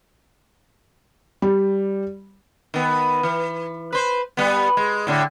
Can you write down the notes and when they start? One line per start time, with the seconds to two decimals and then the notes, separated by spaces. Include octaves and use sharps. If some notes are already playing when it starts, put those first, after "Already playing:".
1.42 G3
2.74 D#3 B3
3.23 E3
3.93 B4 C5
4.37 G3 B3
4.77 G#3
5.07 A2 D3